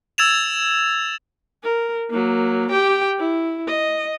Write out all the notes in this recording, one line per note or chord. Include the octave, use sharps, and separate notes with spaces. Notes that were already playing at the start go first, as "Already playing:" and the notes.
E6 G#6 A6 E7 F7
A#4
F#3 A#3
G4 G5
E4
D#5